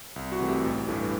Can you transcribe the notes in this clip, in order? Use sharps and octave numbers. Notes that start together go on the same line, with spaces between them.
C2
F#4
C3 E3 A3
G4
A1
G2 E3 A3